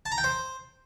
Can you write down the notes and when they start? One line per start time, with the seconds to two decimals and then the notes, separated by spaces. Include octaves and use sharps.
0.06 A5
0.12 A#5
0.18 G5
0.24 C5